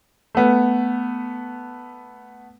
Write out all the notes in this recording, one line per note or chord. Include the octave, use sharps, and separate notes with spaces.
A3 B3